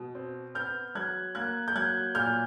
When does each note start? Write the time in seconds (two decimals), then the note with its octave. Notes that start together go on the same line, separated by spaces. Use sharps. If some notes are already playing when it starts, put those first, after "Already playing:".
Already playing: B2
0.15 C4
0.55 B3 F6 G6
0.95 F#3 F#6 G#6
1.35 A#3 F#6 G#6
1.68 G6
1.75 F#3 F#6 G#6
2.15 A#2 F6 G6